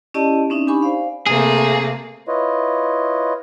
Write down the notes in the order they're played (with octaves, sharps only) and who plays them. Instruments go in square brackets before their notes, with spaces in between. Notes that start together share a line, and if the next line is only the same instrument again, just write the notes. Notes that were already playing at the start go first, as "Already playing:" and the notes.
[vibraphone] C#4 E4 G4 D5 D#5 A5
C4 C#4 D#4 E5
D4 D#4 G4 G#5 B5 C#6
C5 D5 F5
[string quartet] C3 A3 A#3 [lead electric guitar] G#4
[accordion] E4 F4 B4 C#5 D#5